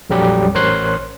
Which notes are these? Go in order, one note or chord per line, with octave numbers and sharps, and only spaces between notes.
A#1 F2 F#3 G3 G4
A1 A#4 C5 C#5 C6 F#6